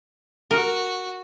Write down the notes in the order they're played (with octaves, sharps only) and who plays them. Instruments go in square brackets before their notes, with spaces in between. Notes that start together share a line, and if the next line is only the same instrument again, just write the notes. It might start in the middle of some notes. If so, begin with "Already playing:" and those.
[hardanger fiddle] F#4 [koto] A#4